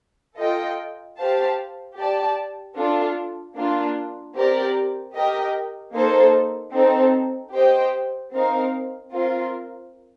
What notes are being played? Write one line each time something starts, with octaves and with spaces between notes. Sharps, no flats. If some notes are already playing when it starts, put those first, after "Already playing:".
F4 A4 D#5 G5
G4 C5 F5 A5
G4 D5 A5
D4 F4 A4
A#3 D4 F4
C4 G4 A#4 D5
G4 A#4 D#5 G5
A#3 D#4 A4 C5
C4 D#4 A4
G4 C5 D#5 G5
C4 D#4 A#4 F5
C4 F4 A#4